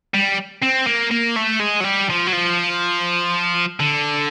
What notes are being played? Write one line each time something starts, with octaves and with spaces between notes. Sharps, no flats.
G3
C4
A#3
A#3
A3
G#3
F#3
G3
F3
F#3
F3
D3